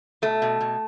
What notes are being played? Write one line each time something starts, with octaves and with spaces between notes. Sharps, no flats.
B2 A3
B2
B2